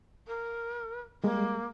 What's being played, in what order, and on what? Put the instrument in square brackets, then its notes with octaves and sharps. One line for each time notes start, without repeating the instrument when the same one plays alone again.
[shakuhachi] A#4
[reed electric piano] G3 G#3 [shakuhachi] A#3